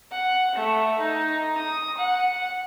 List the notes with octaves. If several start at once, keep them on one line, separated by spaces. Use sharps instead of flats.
F#5
A3
D#4
D#6
F#5